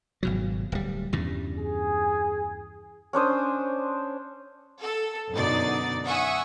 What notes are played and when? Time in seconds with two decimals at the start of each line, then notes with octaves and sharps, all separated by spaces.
0.23 G#1 B2 F#3
0.72 D1 G3
1.13 E2 G2 C#3
1.58 G#4
3.13 C#4 D4 C5 D#6
4.80 A4
5.34 F#2 B2 D3 D#4 D5 A6
6.05 E5 F#5 G#5 C#6 D#6